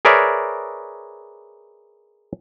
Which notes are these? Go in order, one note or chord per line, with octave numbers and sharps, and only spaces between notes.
G#4 A#4 B4 C#5 D5 E5